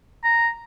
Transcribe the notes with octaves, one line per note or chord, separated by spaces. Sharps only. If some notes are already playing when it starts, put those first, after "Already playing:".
A#5